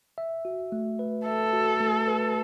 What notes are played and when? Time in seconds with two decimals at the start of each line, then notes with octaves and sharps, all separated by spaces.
0.18 E5
0.45 F#4
0.72 A3
0.99 B4
1.26 A4 E5
1.53 F#4
1.80 A3
2.07 B4